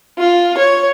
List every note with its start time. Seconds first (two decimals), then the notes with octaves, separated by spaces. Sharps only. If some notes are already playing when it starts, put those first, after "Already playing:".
0.19 F4
0.57 C#5